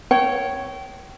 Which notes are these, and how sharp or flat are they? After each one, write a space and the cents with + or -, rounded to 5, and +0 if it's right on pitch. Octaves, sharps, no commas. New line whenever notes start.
C#5 +0 G5 -25